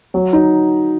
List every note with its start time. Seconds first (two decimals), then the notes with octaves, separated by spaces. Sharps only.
0.14 F#3
0.33 D#4